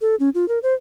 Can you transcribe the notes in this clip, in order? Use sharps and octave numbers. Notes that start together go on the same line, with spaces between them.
A4
C#4
F4
A#4
C5